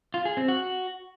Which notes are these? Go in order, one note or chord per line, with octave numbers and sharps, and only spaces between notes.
F4
G#4
C4
F#4